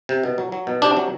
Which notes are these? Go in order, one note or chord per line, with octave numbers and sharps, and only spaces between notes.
C3
B2
F#3
F#3
B2
C3 D4
F#3